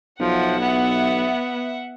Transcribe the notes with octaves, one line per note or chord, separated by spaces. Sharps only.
B1 F3 E5 F#5
B3